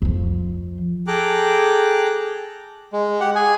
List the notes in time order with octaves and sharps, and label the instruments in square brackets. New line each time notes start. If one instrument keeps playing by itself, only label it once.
[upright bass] F2 F3
[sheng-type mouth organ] G#4 A4 G5 A#5 D6 F#6
[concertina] G#3
G4 F#5
G#4 G#5